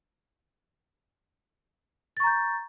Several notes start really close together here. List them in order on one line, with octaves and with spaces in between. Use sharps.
A6 C#6 A#5 G6